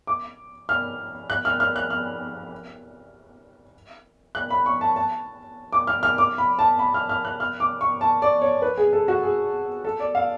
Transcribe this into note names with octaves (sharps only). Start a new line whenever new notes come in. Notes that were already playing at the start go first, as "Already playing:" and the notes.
D6
F6
F#6
F6
F6
F#6
F6
F#6
B5
C#6
A5
A5
D6
F6
F6
D6
B5
A5
B5
F6
F6
F#6
F6
D6
C#6
A5
D5
C#5
B4
G#4
A4
F#4
G#4
A4
D5
F5